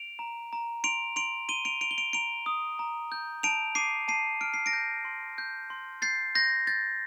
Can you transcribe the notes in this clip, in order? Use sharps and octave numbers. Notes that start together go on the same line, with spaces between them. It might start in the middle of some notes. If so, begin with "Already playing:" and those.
Already playing: D7 F7
A#5
A#5
C6 D7 F7
C6 D7 F7
C6 D#7 G7
D7 F7
C6 D7 F7
G7
D7 F7
A#5 D7 F7
D#6
A#5
G6
A5 D7 F7
D6 C7 D#7
A5 C7 D#7
F6 D7
C7
A#6 D7
G6
C6
G6
C6
G6 A6 C7
C6 G6 A#6
G6 A6